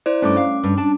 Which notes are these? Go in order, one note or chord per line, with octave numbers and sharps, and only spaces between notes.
E4 C5 D5
G2 A3 C#4 D#4 D6
F5
G2
D4 A5